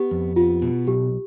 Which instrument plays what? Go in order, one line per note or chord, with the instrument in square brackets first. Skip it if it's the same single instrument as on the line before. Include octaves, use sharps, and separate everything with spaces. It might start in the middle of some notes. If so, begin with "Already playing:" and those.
Already playing: [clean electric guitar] B3 [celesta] G4
[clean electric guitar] F2
[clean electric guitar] B3 [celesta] F4
[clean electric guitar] B2
[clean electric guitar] B1 [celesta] G4